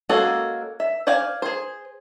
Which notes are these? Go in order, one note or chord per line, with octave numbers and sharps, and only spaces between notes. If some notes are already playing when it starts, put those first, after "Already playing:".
G#3 A#3 C#4 F#4 A4
E5
C5 D5 F5 G#5
G#4 C5